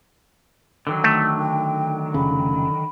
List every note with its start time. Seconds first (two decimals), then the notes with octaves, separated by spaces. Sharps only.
0.87 D3 D#3 F#3
1.04 A3
1.39 G5
2.14 F1 C#3 B5